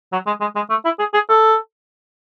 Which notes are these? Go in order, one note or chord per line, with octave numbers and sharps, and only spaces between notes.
F#3
G#3
G#3
G#3
A3
E4
G#4
G#4
A4